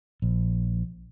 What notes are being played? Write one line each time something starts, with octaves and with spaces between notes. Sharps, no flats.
A#1